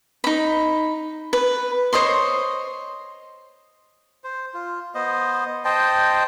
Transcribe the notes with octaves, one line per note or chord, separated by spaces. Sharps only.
D#4 B5
B4
C5 C#5 D#5 C6
C5
F4
B3 C5 D#5
C5 D#5 G5 A5